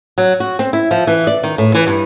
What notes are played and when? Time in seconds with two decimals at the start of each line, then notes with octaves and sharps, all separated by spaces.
0.18 F#3
0.40 F#4
0.59 C4
0.73 E4
0.91 F3
1.07 E3
1.27 D5
1.43 D#3
1.58 A2
1.75 E3
1.87 G2